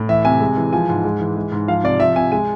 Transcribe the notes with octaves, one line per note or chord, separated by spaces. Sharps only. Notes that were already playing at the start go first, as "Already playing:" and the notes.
Already playing: A2
E3 E5
C3 G#5
G#3
E3
F3 G#5
G#2
G#3
E3
G#3
G#2
F3 F5
C3 D5
F3 E5
C3 G#5
G#3 G#5